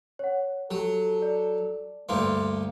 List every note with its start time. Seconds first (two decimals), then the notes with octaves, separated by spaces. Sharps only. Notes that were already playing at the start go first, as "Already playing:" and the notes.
0.19 C#5 F#5
0.71 F#3 G4 A4
1.22 D5
2.09 D2 G2 A3 A#3 C6